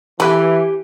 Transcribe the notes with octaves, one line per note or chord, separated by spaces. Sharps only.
E3 A3 G4 B4 G#5